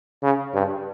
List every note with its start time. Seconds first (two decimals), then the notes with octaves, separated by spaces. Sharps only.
0.23 C#3
0.54 G2